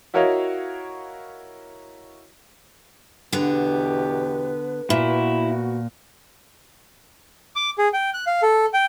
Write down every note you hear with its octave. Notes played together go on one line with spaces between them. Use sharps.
E4 F#4 A#4 C#5 D#5 F5
E2 B2 D3 B3 G4 B4
A#2 B3 E4 F#4
D6
G#4
G5
F#6
F5
A4
G5